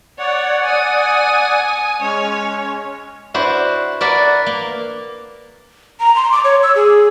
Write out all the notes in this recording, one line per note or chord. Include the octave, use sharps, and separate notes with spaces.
C#5 D5 F#5
G#5 D#6
G#3 C#4 C#5
D4 E4 F#4 B4 C5
A#4 B4 D5 E5 F#5 B5
A#3
A#5
C6
D6
C#5
E6
G#4